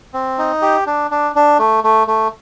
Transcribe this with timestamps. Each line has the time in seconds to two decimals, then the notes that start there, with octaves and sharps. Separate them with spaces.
0.14 C4
0.38 D#4
0.62 G4
0.87 D4
1.11 D4
1.35 D4
1.59 A3
1.84 A3
2.07 A3